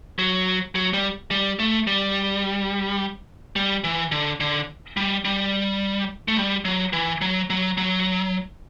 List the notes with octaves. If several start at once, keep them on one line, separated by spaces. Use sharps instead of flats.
F#3
F#3
G3
G3
A3
G3
G3
E3
D3
D3
G3
G3
A3
G3
F#3
E3
F#3
F#3
F#3